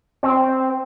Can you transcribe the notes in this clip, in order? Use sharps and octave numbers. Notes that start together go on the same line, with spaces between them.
C4